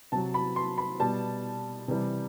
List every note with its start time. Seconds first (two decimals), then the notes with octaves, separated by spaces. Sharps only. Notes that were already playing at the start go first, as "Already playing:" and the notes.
0.12 C3 F#3 A5
0.34 B5
0.56 C6
0.78 B5
1.00 B2 G3 A5
1.88 C3 E3 G3